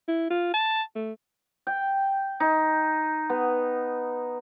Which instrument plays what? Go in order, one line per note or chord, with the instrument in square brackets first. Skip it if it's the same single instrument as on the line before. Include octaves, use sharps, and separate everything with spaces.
[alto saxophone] E4
F4
A5
A3
[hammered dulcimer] G5
D#4
B3